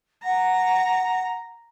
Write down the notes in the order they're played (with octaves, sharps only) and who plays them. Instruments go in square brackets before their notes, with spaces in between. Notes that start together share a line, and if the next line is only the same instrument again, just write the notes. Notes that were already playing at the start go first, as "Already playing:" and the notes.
[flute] F#5 [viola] A#5